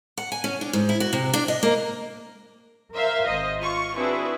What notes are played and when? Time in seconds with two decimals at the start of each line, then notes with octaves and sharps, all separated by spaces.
0.18 F#5
0.32 G#5
0.44 C#4
0.61 D4
0.73 G#2
0.89 E4
1.00 F#4
1.13 C3
1.34 D4
1.48 D#5
1.63 A#3
2.94 A#4 C5 E5 F5
3.26 G#1 C5 D#5
3.59 F4 C#6
3.96 C4 D4 E4 F#4 G#4 B4